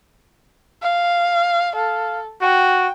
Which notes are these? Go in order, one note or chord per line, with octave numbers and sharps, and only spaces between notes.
F5
A4 F5
F#4 G5